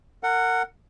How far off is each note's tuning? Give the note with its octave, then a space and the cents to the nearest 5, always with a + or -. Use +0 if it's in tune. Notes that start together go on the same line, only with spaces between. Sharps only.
A#4 -30 F#5 +0